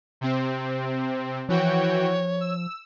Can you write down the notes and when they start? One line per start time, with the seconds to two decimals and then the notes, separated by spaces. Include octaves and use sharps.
0.21 C3 C4
1.49 E3 F3 F#4 C#5 G5
2.41 E6